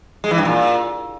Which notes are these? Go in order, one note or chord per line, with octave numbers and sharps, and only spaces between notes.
G#3
E3
G2
A#2